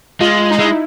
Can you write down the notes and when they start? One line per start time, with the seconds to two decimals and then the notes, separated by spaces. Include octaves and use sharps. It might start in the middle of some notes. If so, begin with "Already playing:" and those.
0.21 G#3 F4
0.51 D#4
0.59 G#3 E4